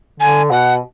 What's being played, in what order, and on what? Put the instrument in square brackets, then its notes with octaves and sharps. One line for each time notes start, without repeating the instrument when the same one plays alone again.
[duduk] D3 [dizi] G#5
[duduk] B2 [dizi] F#5